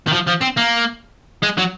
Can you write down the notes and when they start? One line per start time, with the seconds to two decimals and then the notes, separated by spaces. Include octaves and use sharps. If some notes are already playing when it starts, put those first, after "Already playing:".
0.07 D#3
0.13 F3
0.27 F3
0.41 C4
0.57 A#3
1.43 G#3
1.58 F#3